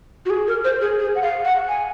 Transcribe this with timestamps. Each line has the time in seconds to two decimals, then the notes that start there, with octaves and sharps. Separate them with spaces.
0.26 F#4
0.30 G#4
0.47 A#4
0.65 C5
0.81 G#4
0.99 G#4
1.15 F#5
1.22 F5
1.45 F#5
1.68 G#5